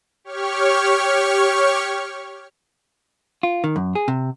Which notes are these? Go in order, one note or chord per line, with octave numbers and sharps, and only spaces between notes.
G4 C#5 C#6 F6
F4
D#3
F#2
G#4
C3